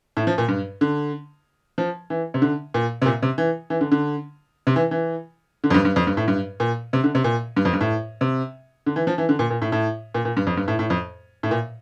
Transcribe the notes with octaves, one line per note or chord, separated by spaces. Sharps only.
A2
F3
A#2
G2
D3
F3
E3
C3
D3
A#2
C3
A#2
C3
E3
E3
D3
D3
C3
E3
E3
D3
F2
G2
G2
F2
G2
A2
G2
A#2
C3
D3
C3
A#2
G2
F2
G2
A2
C3
D3
E3
F3
E3
D3
A#2
A#2
A2
A2
A#2
A#2
G2
F2
G2
A2
A2
F2
A2
A#2